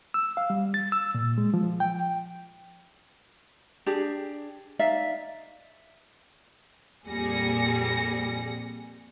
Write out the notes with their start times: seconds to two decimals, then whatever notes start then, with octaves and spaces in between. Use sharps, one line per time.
0.14 E6
0.37 F5
0.50 G3
0.74 A6
0.92 E6
1.15 A#2
1.38 G#3
1.54 F3
1.80 G5
3.86 D4 G4 G#4
4.79 D#4 D5 E5 F5
7.07 F2 A#2 G3 G#4 A#6 C#7